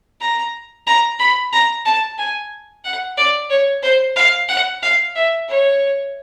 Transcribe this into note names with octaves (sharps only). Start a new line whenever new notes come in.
A#5
A#5
B5
A#5
A5
G#5
F#5
D5
C#5
C5
F5
F#5
F5
E5
C#5